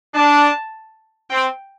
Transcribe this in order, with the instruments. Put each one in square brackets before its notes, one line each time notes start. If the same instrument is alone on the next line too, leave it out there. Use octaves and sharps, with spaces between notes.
[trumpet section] D4 [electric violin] A5
[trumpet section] C4 [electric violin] G5